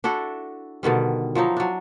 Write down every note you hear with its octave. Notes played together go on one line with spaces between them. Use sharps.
D4 E4 F#4 A4
B2 D3 D#3 G3
F3 F#3 D#4 E4
F#3 D4